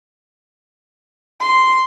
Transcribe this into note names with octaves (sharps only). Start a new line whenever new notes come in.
C6